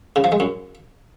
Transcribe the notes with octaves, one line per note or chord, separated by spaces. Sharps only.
C#3
F3
G#3
F#2